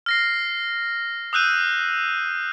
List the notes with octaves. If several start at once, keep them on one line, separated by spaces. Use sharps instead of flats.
F6 A#6 C7
D#6 E6 F#6 G6 D#7